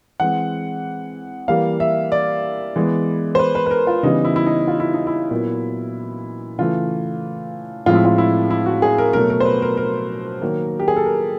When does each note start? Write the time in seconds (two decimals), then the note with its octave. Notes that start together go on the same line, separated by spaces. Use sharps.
0.20 E3 G#3 C4 F#5
1.48 E3 G3 A#3 F5
1.80 E5
2.12 D5
2.76 E3 G#3 B3
3.35 C5
3.39 B4
3.55 B4
3.66 B4
3.71 A#4
3.87 F4
4.03 C#3 E3 G3 B3 D#4
4.25 E4
4.36 E4
4.46 D#4
4.68 F4
4.80 E4
4.94 D#4
5.07 E4
5.31 A#2 F#3 B3
6.58 C#3 E3 A3 F4
7.86 A2 F3 G#3 C4 F4
7.95 E4
8.05 F4
8.18 E4
8.51 E4
8.66 F#4
8.82 G#4
8.98 A#4
9.13 B2 F#3 A3 A#4
9.30 A#4
9.40 C5
9.45 B4
9.62 A#4
9.77 A#4
10.41 D#3 F#3 A#3
10.80 G4
10.88 G#4
10.96 A4
11.06 A#4